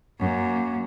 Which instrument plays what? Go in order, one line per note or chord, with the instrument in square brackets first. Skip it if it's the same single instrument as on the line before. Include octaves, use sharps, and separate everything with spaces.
[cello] F#2 A#3